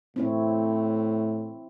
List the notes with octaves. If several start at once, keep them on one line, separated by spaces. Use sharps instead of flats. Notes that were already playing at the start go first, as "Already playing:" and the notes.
A2 C4 E4 C#5